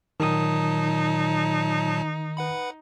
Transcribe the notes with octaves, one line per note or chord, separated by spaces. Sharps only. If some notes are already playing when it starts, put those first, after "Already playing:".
A#2 D#3 F#3 D#4 A5 D#6
B4 F#5 B5